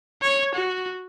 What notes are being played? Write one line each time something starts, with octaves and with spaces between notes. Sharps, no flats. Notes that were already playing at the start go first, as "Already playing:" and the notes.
C#5
F#4